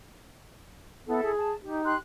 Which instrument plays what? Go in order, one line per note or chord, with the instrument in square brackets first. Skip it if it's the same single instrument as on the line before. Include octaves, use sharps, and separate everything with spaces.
[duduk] B3 [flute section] E4 A4
[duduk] G#4
[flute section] A5
[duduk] D#4 [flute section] G4
[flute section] G4 C6 F#6